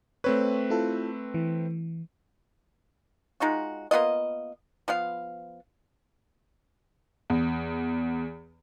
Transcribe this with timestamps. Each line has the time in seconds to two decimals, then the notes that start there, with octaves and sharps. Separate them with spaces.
0.24 A3 C4 B4 C#5
0.70 E4 F4 A4
1.34 E3
3.40 G#3 D#4 F4 F#4
3.91 A#3 B3 F4 D#5
4.88 F3 B3 F5
7.30 E2